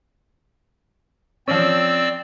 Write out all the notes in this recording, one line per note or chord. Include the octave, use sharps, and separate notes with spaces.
F3 C4 C#4 D5 E6